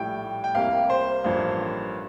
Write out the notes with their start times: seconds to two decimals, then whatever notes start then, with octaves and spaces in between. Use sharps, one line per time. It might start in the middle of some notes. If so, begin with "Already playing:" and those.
Already playing: A#1 A2 G3 G5
0.44 G5
0.55 C2 C3 G3 A#3 F5
0.90 C5
1.24 A1 G2 F3 A#3